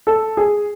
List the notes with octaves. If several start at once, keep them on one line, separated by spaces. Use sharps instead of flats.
A4
G#4